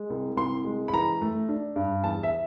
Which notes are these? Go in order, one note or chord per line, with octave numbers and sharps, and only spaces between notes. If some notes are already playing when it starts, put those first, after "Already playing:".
Already playing: G#3
C2
C2 C6
G#3
B5
E3 A#5
A3
D4
G2
E2 A5
E5